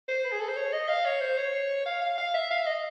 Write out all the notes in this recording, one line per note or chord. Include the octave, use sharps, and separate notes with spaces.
C5
B4
G#4
A4
C5
C#5
D#5
F5
C#5
C5
C#5
F5
F5
F5
E5
F5
E5
D#5